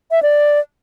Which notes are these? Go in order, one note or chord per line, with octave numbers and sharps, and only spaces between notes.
E5
D5